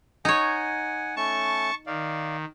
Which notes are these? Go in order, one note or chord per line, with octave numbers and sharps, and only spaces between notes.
D#4 C#5 F#5 G#5
A3 C#4 A5 C#6
D#3 D5 F5